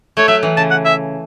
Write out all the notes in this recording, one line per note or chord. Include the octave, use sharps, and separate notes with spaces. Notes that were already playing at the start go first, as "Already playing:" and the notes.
A3 C#5
F#3 E5
E3
C#3 A5
F#5
E5